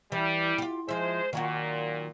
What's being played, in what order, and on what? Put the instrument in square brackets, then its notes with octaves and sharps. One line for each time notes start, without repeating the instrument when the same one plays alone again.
[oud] E3 [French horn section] G3
[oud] F4 G4
[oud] F3 E5 [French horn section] G#3 C5
[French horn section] A#2 [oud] D#3 F#3 F#4